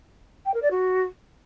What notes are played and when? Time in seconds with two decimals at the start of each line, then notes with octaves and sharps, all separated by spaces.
0.46 G5
0.54 A#4
0.62 D5
0.71 F#4